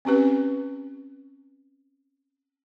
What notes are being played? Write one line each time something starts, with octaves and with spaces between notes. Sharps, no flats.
C4 C#4 G4 B4